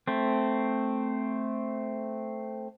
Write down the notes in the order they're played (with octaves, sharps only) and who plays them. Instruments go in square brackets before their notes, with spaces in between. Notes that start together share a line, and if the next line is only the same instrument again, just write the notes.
[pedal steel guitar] A3 C4